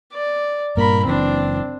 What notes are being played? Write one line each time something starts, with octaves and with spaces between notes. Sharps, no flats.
D5
G2 A#2 A#3 A#4 B5
F#1 E3 C4 D4